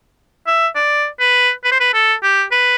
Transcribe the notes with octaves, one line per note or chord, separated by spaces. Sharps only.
E5
D5
B4
B4
C5
B4
A4
G4
B4